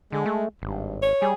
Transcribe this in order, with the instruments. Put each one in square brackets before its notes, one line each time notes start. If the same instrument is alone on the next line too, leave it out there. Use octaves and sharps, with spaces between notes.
[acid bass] D3 [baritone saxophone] G#3
[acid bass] A3
[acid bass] G#1 [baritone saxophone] G2
[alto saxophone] C#5
[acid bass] G3 [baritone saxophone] G#4